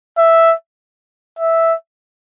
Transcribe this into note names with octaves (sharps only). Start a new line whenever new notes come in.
E5
E5